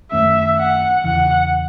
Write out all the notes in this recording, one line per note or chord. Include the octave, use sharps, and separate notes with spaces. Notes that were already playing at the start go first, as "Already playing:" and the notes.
F#2 D#3 A3 C#4 E5
F#5
E2 C#3 E3 F#5